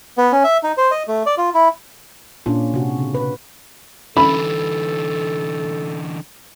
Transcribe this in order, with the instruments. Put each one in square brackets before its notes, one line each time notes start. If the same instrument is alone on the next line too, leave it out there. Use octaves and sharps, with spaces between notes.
[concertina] B3
C#4
E5
D#4
C5
D#5
A3
D5
F4
E4
[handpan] A#2 C#4 D4 F4
C3 F#4
C#3
B4
[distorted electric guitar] D3 E3 [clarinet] A4 [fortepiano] B5